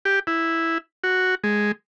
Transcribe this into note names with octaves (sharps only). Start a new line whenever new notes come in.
G4
E4
F#4
G#3